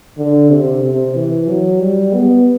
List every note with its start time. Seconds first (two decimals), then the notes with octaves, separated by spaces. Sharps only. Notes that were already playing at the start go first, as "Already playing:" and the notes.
0.18 D3
0.51 C3
0.84 C3
1.16 E3
1.48 F#3
1.81 G3
2.13 B3